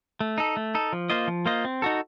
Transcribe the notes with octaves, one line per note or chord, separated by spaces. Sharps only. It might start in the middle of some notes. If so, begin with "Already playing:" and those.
A3
D#4 A4
A3
D#4 A4
F3
A#3 F4 C5 D#5
F3
A#3 F4 C5 D#5
C4
D#4 F#4 A4